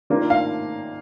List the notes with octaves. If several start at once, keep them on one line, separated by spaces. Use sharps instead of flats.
D#3 A#3 D4 F4
F5